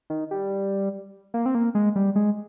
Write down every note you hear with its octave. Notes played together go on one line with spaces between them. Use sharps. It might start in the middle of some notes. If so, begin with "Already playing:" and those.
D#3
G3
A#3
C4
A#3
G#3
G3
G#3